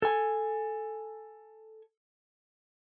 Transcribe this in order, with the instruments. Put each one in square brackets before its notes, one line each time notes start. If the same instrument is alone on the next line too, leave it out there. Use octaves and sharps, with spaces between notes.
[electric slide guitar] A4 G#5